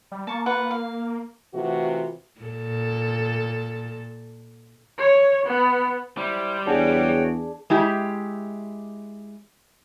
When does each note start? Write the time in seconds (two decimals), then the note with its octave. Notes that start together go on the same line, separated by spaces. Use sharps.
0.12 G3
0.27 A#3 A5 C#6
0.46 F4 B4 F#5
0.71 F5
1.54 C3 E3 A3 F4 F#4
2.41 A#2 A4
4.98 C#5
5.47 B3
6.18 G3 E4 C5
6.67 E2 D4 F#4 G#4 C#5 G5
7.70 G#3 E4 G4